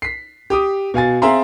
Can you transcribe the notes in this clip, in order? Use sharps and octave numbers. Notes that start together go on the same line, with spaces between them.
B6 C7
G4 D6 D#6
B2 F5 G#5 A6
C4 G#4 E5 F5 A#5 C6